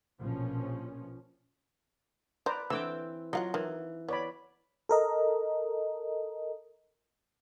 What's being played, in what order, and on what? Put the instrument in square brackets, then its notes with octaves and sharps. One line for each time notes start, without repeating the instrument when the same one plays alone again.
[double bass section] A#1 B2 F3 C#4
[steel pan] B4 D5 A#5 [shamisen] C5
[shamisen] D3 [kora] E3 C4 G5 [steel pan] D6 E6
[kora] F#3 F4 [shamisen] D#5 F5 F#5
[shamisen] D#3 [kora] E3
[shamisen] B3 [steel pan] C#5 D5 B5
[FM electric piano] A4 A#4 D#5